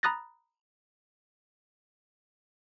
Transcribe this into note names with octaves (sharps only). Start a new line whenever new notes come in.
A#5 B5 D#6 F#6 A6 A#6